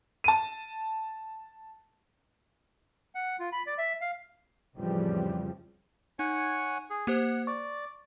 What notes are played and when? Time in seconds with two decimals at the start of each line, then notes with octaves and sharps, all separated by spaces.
0.24 A5 D#7
3.15 F#5
3.39 F4
3.52 B5
3.67 D5
3.78 E5
4.01 F5
4.77 F2 A2 C#3 E3 F3 G3
6.19 D#4 C#5 F#5 G#5
6.90 G#4
7.07 A#3 G4 C5 F#5
7.47 D5 C#6